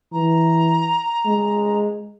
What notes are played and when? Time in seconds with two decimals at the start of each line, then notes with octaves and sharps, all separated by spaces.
0.12 E3 A#5
1.25 G#3